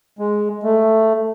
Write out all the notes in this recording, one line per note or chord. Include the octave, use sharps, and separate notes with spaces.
G#3
A3